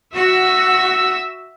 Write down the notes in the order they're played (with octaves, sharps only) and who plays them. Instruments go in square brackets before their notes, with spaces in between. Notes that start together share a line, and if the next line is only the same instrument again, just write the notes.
[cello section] F#4 [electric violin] E5 E6